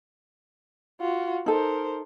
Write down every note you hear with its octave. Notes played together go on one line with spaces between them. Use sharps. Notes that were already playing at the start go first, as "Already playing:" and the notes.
F4 F#4
D#4 A4 A#4 C5